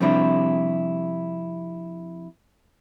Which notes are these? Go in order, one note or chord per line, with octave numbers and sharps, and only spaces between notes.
F2 C3 G3 D4 E4